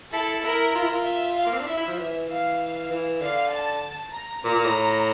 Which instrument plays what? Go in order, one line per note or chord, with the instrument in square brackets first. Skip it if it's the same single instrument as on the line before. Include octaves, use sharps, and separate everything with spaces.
[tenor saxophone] E4 [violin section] A4
[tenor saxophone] E4 [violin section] A#4
[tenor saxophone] F4
E4
F4
[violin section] E5
F5
[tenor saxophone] A#3
C4
D4
[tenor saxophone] E4 [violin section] E5
[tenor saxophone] E4
F3
E3
[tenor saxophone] E3 [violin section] F5
[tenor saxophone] E3
[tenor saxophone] D3 [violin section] F5
[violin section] A5
A#5
[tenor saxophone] A#2 [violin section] A#5
[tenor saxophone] A#2
A2